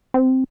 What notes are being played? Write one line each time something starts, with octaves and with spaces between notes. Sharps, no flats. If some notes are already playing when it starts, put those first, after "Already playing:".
C4